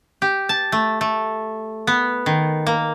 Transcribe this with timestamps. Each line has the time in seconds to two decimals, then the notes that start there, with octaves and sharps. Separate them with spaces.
0.22 G4
0.49 A5
0.72 A3
1.01 A3
1.87 B3
2.26 D#3
2.67 A#3